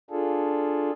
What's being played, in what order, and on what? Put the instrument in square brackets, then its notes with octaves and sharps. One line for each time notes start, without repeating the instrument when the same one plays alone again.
[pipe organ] D4 F4 G#4 A4